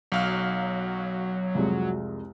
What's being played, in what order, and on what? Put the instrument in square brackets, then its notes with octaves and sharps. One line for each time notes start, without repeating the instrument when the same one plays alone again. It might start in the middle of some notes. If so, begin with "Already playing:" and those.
[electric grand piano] B1 F5 F6 [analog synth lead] F#3
[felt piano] C2 F2 G#3